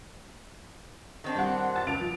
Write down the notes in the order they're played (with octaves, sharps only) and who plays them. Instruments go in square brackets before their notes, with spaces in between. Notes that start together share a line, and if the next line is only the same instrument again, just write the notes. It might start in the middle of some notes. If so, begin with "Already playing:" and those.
[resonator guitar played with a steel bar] D#3 C4 D4
[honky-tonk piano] G3 F#5
A5 A6
C#2 D7 F7
F3